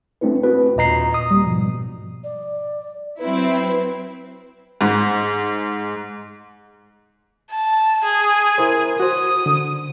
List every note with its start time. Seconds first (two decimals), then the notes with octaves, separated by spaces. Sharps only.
0.21 A3 C4 D4 E4 B4
0.43 C4 E4 F#4 B4
0.76 D#2 A#2 D#5 A#5 C7
1.14 D#6
1.31 G3 A#3
1.45 G#2 B2 F3
2.24 D5
3.19 F#3 C4 E4 B4
4.81 G#2
7.51 A5
8.04 G#4
8.58 E4 A#4 C5
9.00 F#4 C5 D#6
9.46 D3